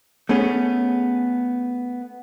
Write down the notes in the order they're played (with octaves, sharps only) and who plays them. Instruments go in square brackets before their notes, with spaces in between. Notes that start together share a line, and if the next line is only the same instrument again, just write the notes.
[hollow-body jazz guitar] A3 B3 C#4 G#4